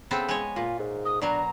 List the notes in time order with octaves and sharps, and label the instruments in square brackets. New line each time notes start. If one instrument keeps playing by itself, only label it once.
[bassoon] C#3 [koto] B3 C4 A4 [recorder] A5
[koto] G#3 C#5 [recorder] G#5
[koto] A#2 [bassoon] F4
[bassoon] G#2
[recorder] D#6
[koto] B2 F#3 [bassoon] D4 [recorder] A#5